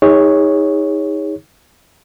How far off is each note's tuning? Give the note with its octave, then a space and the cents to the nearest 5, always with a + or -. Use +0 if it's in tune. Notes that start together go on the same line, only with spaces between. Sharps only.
D#4 +30 G#4 -30 C#5 +0